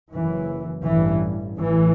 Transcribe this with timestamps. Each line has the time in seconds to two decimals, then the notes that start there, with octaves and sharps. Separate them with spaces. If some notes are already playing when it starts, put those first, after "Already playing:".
0.13 F#1 F#2 E3
0.85 A1 G2 E3
1.58 A1 A2 E3